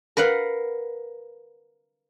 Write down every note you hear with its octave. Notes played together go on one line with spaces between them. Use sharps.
A#4 B4 F5 F#5